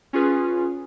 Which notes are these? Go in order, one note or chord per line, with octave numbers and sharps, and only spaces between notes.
C#4 F4 G#4 B4